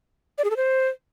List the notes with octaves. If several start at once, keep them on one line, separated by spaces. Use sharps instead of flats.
D5
G#4
A4
C5